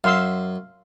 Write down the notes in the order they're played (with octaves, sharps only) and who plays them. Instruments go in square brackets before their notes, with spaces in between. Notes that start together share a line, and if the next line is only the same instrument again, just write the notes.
[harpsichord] F#2 [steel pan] F5 C6 E6